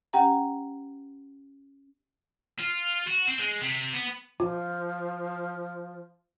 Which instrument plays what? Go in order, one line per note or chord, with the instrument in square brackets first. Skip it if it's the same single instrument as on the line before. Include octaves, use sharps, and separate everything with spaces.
[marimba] C#4 G4 F#5 G5 A#5
[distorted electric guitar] F4
F#4
C4
G#3
C3
B3
[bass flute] F3 [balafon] F4